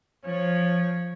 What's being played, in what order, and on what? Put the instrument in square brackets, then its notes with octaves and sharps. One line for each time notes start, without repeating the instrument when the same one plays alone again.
[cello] F3 C#5